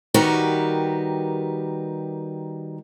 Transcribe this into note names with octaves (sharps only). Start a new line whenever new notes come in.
D#3 G3 F#4 G4 A#4 B4